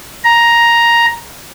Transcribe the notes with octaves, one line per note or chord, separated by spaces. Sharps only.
A#5